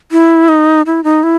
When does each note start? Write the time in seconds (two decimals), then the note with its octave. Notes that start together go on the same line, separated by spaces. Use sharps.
0.12 E4
0.48 D#4
0.86 E4
1.04 D#4
1.23 E4